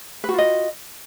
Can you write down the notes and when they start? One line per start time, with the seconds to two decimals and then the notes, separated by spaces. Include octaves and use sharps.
0.24 B4
0.29 F#4
0.34 F4
0.38 D#5